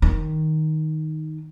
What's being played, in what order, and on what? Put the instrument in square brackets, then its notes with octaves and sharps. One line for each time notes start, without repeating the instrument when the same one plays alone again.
[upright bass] D#3